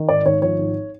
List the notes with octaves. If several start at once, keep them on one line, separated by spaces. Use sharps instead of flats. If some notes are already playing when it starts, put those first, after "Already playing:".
Already playing: D#3
G#1 D5
G#1 C#5
F3 C#5
G#1